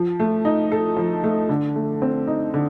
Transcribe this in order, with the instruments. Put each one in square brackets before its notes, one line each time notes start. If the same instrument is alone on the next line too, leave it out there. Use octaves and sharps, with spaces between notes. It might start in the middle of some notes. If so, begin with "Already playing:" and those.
Already playing: [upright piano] F3
A3
D#4
A4
F3
A3
D3
A3
C4
D#4
D3